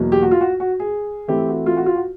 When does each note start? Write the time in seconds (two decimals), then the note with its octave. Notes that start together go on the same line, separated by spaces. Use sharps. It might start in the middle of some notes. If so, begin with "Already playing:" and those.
Already playing: E2 B2 F#3 A#3
0.12 G4
0.22 F#4
0.31 F4
0.41 F#4
0.60 F#4
0.80 G#4
1.28 E3 A3 C4 E4 G4
1.48 F#4
1.66 F4
1.77 F#4
1.86 F4
1.96 F#4